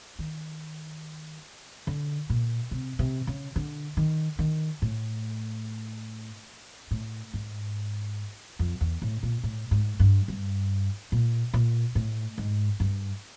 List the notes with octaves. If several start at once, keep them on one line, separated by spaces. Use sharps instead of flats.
D#3
D3
A#2
C3
C3
C#3
D3
D#3
D#3
A2
A2
G#2
F2
E2
A2
A#2
A2
G#2
G2
G2
A#2
A#2
A2
G#2
G2